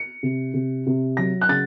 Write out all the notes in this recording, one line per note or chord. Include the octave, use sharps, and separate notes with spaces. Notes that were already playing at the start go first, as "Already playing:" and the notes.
Already playing: C#7
C3
C3
C3
F#3 A#6
F#6
C#3 A6